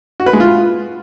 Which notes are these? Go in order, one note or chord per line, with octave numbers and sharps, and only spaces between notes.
F#4
B4
G#3
F4